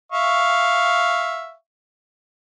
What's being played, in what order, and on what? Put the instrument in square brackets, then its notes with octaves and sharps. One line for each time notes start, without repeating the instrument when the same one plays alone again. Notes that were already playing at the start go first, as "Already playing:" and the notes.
[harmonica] E5 F5 C#6